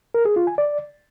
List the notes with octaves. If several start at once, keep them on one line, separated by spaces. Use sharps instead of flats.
A#4
G#4
F4
G#5
D5